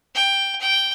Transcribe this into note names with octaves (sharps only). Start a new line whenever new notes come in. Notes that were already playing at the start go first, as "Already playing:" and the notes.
G5
G5